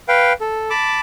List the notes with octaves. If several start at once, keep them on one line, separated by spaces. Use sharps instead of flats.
B4 F5 G5
A4
A5 B5 D6